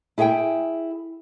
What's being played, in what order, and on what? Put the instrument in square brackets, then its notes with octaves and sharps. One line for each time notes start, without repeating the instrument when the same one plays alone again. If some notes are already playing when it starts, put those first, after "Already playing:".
[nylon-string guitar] E4 G#4 E5 F#5 G5